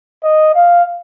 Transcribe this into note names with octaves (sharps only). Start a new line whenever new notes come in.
D#5
F5